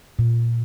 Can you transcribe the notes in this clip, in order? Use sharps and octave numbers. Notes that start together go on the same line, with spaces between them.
A#2